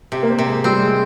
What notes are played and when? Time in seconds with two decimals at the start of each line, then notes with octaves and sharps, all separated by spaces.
0.12 C3 G4
0.23 A#3
0.30 C4
0.39 C3
0.46 G#3
0.64 G3 C4
0.82 G#3